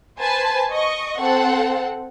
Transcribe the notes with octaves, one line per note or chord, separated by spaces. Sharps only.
B4 C5 G#5 A5
D#5 C#6
C4 A4 F#5